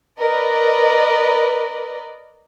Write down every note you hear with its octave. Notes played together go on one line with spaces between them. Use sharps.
A#4 B4 D5 D#5